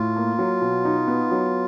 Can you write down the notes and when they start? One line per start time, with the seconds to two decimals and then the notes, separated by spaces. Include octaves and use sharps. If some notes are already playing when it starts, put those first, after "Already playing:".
Already playing: A2 F4
0.16 A#3
0.39 F#3
0.61 B2
0.85 D#4
1.08 B3
1.31 F#3